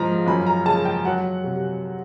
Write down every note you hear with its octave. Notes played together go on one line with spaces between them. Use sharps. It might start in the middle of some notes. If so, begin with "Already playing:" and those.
Already playing: G#2 F3 A#5
F#2 B5
A#5
C#3 A5
G5
F#3 F#5
C3